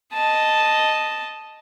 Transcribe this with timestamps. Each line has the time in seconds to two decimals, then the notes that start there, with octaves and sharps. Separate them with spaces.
0.13 D#5 A5